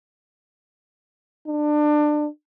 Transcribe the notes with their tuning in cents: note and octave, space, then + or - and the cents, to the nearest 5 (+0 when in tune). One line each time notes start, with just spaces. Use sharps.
D4 +25